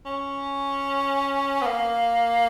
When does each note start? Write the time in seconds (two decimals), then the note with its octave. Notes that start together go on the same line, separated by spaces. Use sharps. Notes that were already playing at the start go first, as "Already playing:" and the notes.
0.05 C#4
1.62 B3
1.66 A#3